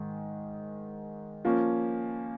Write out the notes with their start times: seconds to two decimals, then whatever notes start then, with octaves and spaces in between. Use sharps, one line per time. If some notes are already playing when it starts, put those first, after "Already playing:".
Already playing: G#2 D#3 G#3
1.45 F3 A#3 C#4